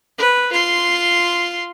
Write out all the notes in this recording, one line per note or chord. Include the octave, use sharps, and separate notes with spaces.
B4
F4 C6